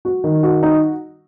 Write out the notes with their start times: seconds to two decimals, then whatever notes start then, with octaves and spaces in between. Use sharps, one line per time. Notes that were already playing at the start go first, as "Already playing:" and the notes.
0.05 F#4
0.24 D#3
0.43 F#4
0.63 D#4